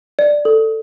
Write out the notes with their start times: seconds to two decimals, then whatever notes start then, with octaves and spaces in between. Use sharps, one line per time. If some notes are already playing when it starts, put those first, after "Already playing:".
0.19 D5
0.45 A4